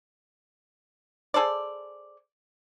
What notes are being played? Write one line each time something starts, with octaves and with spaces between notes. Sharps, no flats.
G#4 A4 C5 D5